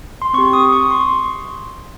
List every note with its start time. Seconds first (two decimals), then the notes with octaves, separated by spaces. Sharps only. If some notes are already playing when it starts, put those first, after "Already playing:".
0.22 C6
0.33 C4 C#6
0.38 G4
0.53 D#6
0.72 C#6
0.91 C6